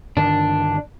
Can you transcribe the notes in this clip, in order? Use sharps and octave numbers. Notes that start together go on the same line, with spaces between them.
G2 D3 D#3 D4